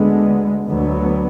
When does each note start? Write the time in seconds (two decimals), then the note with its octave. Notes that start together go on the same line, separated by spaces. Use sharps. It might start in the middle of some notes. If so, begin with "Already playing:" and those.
Already playing: D2 D3 G#3 B3
0.67 D2 D3 F#3 B3